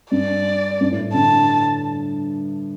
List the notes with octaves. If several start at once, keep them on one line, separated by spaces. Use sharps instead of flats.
G2 D5
G2
A2
A2
D3 A5